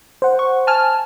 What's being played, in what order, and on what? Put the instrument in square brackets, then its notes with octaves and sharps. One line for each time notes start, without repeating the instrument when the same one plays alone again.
[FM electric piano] C5 F#5
[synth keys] C#6
G#5 A5 F6